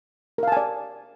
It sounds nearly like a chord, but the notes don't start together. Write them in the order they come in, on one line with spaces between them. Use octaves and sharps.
A#4 F5 A5 G#5 D5